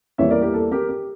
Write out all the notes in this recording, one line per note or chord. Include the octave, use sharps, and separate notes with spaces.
E2 E3 G3 A#3 C#5 E5
A#4 D5
G4 A#4
A4
G4 A#4
G4